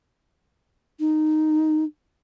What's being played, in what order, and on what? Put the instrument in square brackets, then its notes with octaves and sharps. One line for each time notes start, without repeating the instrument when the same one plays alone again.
[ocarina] D#4